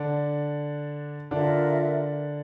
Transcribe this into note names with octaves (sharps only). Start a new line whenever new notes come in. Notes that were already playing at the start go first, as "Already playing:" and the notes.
Already playing: D3 D4
D3 D4 F4 A#4 E5